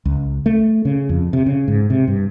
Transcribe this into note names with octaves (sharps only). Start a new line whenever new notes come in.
C#2
A3
C#3
F2
C3
C#3
G#2
C3
G2